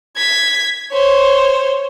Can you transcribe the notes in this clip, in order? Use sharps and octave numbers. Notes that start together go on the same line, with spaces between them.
G#6 B6
C5 C#5